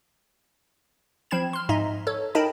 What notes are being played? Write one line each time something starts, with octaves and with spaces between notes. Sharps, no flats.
F3 C4 B5 G#6 E7
C6 F6
G#2 D#4 D#5 E5 C6
A4 C#5
D#4 A#4 D#5 G5 A5 B5